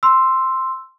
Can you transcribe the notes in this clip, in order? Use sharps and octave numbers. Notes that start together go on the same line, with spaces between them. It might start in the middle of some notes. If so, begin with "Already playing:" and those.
C6 E6